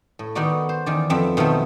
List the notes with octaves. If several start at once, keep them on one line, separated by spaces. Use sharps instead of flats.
A2
D#3 B3 D#4 F#4 D5
C5
E2 D#3 D5
F2 B3 C4 E5
B2 D#3 F3 F#3 A3 C4